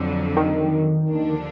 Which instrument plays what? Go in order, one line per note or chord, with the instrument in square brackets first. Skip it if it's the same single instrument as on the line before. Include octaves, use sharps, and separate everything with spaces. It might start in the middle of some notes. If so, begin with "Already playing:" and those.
Already playing: [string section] F2 D3 F#3
[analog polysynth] D#3
[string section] D#2 D3 F3 A#3 D4